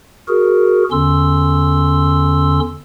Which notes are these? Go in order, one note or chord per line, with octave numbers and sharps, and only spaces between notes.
F#4 G#4 A#4
E2 D3 C#4 C6 E6